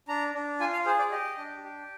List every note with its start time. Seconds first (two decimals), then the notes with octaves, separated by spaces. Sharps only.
0.08 D4 A#5
0.34 D4
0.60 F4 G#5
0.72 F5
0.86 G#4 C5
0.99 D5
1.11 G4 D#5
1.38 D4
1.63 G4